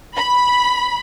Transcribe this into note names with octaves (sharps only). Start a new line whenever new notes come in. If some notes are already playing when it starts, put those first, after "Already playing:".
B5